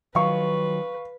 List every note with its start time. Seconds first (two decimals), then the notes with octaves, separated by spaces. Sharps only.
0.15 D#3 F3 F#3 B4 F5 C#6